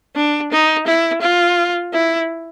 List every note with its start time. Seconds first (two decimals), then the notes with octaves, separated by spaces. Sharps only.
0.16 D4
0.52 D#4
0.87 E4
1.22 F4
1.93 E4